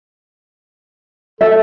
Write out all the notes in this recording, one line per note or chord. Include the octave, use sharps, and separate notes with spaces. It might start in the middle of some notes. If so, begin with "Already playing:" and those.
A4 E5